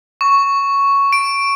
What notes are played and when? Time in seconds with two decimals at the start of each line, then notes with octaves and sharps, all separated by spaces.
0.21 C#6
1.13 D7